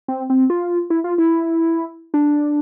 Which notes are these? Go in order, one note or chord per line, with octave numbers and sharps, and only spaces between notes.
C4
C4
F4
E4
F4
E4
D4